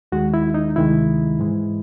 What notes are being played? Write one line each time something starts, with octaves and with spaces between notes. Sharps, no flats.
D#2 D#3 G#3 F#4
E4
D#4
D2 C3 D#3 G#3 E4
G#2 E3 G#3